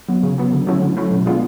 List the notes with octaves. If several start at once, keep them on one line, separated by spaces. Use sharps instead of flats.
F#3 B3
C#3
F#3 B3
D3
F#3 A3 C#4 E4
D3
F#3 A3 C#4 E4
B2
G#3 B3 D4 F4